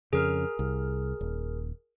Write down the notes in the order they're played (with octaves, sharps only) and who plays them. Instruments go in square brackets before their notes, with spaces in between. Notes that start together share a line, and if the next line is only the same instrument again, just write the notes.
[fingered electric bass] F2 C#3 [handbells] G#4 A#4 F6
[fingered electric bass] C2
D#1